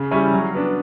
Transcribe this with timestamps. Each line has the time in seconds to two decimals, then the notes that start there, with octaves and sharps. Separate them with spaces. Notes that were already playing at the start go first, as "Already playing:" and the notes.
Already playing: C#3
0.11 G3 C#4 E4
0.33 F#3
0.54 B3 D4